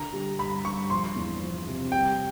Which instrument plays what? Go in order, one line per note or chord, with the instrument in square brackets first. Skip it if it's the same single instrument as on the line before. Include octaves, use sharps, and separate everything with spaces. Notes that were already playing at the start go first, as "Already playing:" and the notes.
Already playing: [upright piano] D3 [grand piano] A#5
[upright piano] G3
[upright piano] G2 [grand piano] B5
[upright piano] G2 [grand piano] C#6
[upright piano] F3 [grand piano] C6
[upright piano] E2
F3
C3
[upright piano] G3 [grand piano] G5